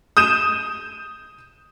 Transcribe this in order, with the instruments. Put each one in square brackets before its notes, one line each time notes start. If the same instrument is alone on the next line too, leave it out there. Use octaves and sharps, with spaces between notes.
[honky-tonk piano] D#6 G6 D#7 E7